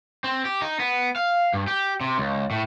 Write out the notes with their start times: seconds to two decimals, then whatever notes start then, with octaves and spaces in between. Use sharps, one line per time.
0.24 C4
0.45 G4
0.62 D#4
0.80 B3
1.16 F5
1.54 G2
1.67 G4
2.01 C3
2.18 C#2
2.51 A2